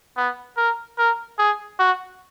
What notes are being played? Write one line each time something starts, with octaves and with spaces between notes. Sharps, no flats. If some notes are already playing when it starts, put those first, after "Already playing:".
B3
A#4
A#4
G#4
F#4